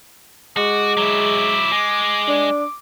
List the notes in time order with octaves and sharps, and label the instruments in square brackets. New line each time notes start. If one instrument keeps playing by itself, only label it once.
[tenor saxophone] G#3 [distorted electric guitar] F#4 [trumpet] D6
[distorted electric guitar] F#3 E4
G#3
[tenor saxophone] D4